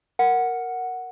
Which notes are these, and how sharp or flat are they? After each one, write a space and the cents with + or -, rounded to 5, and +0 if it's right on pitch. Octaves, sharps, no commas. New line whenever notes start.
A#4 +0 F#5 +0